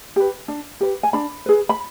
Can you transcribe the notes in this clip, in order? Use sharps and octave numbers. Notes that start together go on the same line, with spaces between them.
G4 B4
D4
G4 B4
G#5
D4 B5
G#4 B4
B5